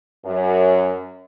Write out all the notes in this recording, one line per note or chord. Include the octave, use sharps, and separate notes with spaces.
F#2